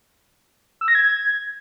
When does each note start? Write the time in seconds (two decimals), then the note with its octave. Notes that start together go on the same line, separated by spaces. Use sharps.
0.81 E6
0.88 A#6
0.95 G#6